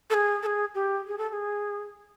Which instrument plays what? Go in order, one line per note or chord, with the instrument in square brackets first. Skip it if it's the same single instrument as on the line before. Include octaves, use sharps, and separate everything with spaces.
[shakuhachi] A4
G#4
A4
G#4
G4
G#4
A4
A4
G#4